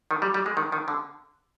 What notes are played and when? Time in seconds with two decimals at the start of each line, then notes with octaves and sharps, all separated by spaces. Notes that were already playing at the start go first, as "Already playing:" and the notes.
0.11 D#3
0.22 G3
0.34 G3
0.46 G#3
0.57 D#3
0.72 D#3
0.88 D3